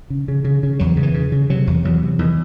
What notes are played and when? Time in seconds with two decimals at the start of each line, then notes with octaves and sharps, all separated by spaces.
0.10 C#3
0.28 C#3
0.45 C#3
0.63 C#3
0.79 E2 F#3
0.97 C#3
1.03 E3
1.14 C#3
1.32 C#3
1.50 C3 F#3
1.67 E2
1.85 E2 F#3
2.03 C3
2.19 E2 D#3